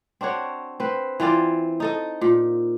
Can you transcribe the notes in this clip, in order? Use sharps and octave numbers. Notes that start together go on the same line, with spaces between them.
C4 D4 F#4 C#5
C4 B4
E3 C4 F4 D5
D#4 A4 D#5
A#2